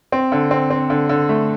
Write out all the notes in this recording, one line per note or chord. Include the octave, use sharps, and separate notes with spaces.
C4
D3
C4
C4
D3
D3
A3